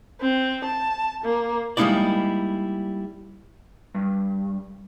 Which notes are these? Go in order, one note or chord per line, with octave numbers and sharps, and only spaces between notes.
C4
A5
A#3
G3 G#3 A#3 D#4 E4 D5
G2